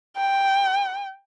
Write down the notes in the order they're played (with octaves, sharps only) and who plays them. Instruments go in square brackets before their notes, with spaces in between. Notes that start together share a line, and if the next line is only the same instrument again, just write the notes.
[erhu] G5